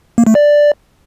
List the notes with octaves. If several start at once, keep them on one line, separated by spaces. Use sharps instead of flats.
A#3
A3
D5